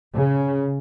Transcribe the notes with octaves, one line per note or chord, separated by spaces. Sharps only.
C#3